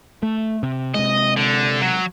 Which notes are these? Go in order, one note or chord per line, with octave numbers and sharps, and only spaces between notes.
A3
C3
C3 G#3 D#5
D3
F#3